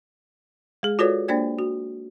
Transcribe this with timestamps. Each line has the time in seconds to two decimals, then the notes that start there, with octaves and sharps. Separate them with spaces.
0.83 G#3 G#4
0.99 F4 F#4 A4 B4 C#5 D5
1.28 A#3 D4 C5 D5 G5 G#6
1.59 F#4